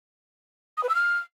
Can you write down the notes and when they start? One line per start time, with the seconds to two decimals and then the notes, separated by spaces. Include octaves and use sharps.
0.77 D#6
0.83 B4
0.89 E6
0.95 F6